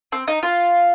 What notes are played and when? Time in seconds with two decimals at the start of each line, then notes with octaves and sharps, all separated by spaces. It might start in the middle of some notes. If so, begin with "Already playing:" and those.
0.12 C4
0.28 D#4
0.43 F4